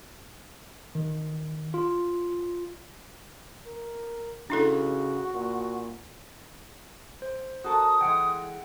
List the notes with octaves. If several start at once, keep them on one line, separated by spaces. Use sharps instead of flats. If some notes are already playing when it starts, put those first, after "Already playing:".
D#3
F4
A#4
C#3 D4 E4 F#4 A4
A#2
C5
F#4 A4 A#4 D#6
E3 G#3 F#5 G5